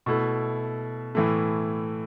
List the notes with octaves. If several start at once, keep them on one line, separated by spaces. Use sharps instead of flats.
B2 A3 E4
A2 E3 A3